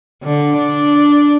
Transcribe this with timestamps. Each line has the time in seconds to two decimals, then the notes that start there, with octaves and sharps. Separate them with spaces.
0.23 D3
0.57 D4